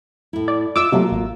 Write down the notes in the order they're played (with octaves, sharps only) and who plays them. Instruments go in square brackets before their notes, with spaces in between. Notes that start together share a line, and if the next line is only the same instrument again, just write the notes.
[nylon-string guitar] A2 E4
[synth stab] D5
[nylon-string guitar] F4 D#5 E5 [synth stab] D6 E6
[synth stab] C3 F#3 A3 [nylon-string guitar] A#3 F4 F#4
[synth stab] A1